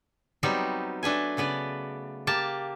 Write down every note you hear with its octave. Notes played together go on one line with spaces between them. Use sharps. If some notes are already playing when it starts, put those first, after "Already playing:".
F#3 G3 B3 C4 D#4 G4
A3 D4 B4 G#5
C#3 B3 B4 D5
A#3 G4 A5